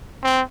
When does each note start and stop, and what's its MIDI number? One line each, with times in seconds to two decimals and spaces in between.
0.24 0.41 60